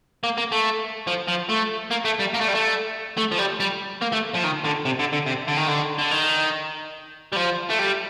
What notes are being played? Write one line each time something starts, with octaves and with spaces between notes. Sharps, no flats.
A#3
A#3
A3
F3
F3
A3
A#3
A3
G3
A#3
A3
G3
A3
A3
F3
G3
G3
A#3
A3
F3
D#3
D3
C3
D3
D3
C3
D3
D#3
D3
D3
D#3
G3
F3
A3
G3